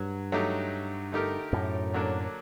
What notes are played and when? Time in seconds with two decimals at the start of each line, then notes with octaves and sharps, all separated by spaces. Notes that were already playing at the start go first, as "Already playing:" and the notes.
Already playing: G2 F#3
0.32 F#3 A3 D#4 G4
1.12 D3 A3 D#4 G4 A#4
1.53 F#2 A2
1.94 D3 F#3 A#3 D4